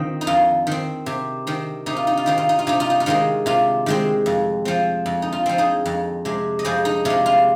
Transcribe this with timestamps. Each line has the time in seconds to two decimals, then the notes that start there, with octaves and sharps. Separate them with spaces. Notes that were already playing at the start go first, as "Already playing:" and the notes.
Already playing: D#3 C4 F4
0.21 D#4
0.27 F2 F4
0.67 D#3 C4
1.06 C3
1.47 D#3 C4
1.86 C3 D#4
1.96 F4
2.07 D#4
2.17 F4
2.26 D#3 C4 D#4
2.38 F4
2.49 D#4
2.59 F4
2.67 C3 D#4
2.80 F4
2.90 D#4
3.00 F4
3.06 D#3 G#3 C4 D#4
3.46 C3 F4
3.86 D#3 G#3 C4
4.26 F2
4.65 F3 C4
5.06 F2
5.22 D#4
5.33 F4
5.46 F3 C4
5.58 D#4 G#4
5.86 F2
6.25 C3 G#3
6.59 D#5
6.65 F2 G#4 C5
6.85 D#4
7.05 C3 G#3 F4
7.26 F4